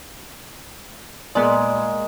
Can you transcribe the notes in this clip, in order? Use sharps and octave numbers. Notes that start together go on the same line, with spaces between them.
A#2 G#3 A#3 B3 D5